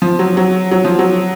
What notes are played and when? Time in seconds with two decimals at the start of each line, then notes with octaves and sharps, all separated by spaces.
0.02 F3
0.19 F#3
0.37 F#3
0.71 F#3
0.85 F3
0.99 F#3